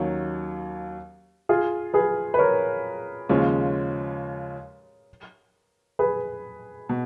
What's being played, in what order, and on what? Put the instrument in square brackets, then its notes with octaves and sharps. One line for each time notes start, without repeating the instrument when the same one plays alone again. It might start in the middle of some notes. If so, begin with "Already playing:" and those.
Already playing: [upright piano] D#2 D#3 F#3 A#3 C#4
[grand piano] F4 G#4
G#4 B4
B4
A#4 C#5
[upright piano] D#2 C#3 F3 G#3 C#4
[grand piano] G#4 B4
[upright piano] B2